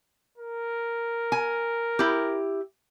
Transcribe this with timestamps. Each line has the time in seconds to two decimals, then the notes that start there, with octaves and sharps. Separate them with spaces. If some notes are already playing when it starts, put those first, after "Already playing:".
0.38 A#4
1.32 G#5
1.99 E4 G4